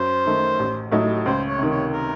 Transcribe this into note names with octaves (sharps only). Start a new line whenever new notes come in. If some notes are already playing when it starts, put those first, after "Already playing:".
Already playing: F#2 C5
D#3 A3
A1
A2 F#3 A3 D#4
C#2 C5
C#5
C3 D#3
C#5
A#4